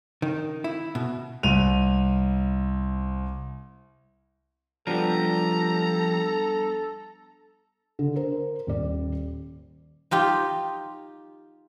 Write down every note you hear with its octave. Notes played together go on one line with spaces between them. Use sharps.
D#3
E4
B2
C2 D#7 F7
F3 G3 B3 D4 G4 A4 A#5
D3
A#4 C5
D#1 D5
D#4 F4 G4